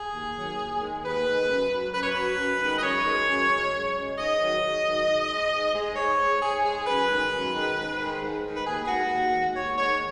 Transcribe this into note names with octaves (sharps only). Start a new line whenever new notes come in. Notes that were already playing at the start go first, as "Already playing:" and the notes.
Already playing: G#4
D#2
D#3 F#3
D#2
D#3 G#3
D#2 B4
D#3 G#3
F#2
F#3
F#2 B4
C#5
F#3 B4
F#2
D#3 G#3
D#5
F#2 C#5
D#3 G#3
F#2
C#3 G#3
F#2
C#3 G#3
G#2 D#5
D#3 F#3
G#2
D#3 F#3
G#2
G#3
G#2
G#3
G#2 C#5
G#3
G#2 G#4
G#3 G#4
F#2 B4
D#3 G#3
F#2
D#3 G#3
G#2
D#3 G#3
G#2
D#3 G#3
B4
D#2 G#4
G#4
D#3 G#3 F#4
D#2
D#3 G#3
D#2 C#5
D#3 G#3 C#5